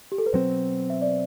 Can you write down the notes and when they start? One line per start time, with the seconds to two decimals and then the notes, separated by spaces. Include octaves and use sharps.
0.12 G4
0.18 A4
0.26 B4
0.33 B2 F#3 C4 C5
0.90 E5
1.02 D5